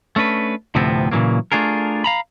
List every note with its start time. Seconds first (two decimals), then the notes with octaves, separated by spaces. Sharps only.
0.16 A3 C#4 D4 B4
0.75 D2 A2 C3 F3 B3 C4
1.11 A#2 C#3 E3 F#3 A#3
1.52 A3 D4 F4 G#4 A#4
2.04 F5 A#5 B5